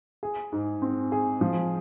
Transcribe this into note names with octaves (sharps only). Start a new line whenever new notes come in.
G#4
G#2
C4
G#4
F3